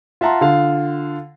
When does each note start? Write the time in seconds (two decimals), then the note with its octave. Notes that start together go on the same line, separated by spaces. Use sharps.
0.21 F4 E5 F#5 A5 A#5 C6
0.41 D3 F4 F5